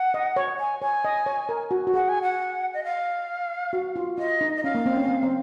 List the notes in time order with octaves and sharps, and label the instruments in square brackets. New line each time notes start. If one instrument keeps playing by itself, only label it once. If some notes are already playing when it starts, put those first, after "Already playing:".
Already playing: [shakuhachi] F#5
[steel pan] D#5
C#5
[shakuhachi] G#5
[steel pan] C#5 [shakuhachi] G#5
[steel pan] D#5
C#5
A#4
F#4
F#4
[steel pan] G#4 [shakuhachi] F#5
[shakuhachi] G#5
F#5
D#5
F5
[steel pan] F#4
F4
[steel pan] F4 [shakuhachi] D#5
[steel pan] D#4
[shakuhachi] D#5
[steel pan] C#4 [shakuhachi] F5
[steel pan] A#3
C4
C#4
C4
C4